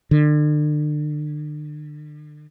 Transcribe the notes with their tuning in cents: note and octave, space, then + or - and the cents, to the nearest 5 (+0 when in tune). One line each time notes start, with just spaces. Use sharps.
D3 +35